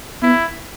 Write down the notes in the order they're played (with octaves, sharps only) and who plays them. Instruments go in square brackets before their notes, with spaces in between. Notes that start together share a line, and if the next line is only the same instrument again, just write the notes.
[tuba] B3 [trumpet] E4